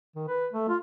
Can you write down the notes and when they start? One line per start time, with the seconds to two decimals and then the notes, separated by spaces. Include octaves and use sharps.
0.16 D#3
0.28 B4
0.53 A3
0.69 F4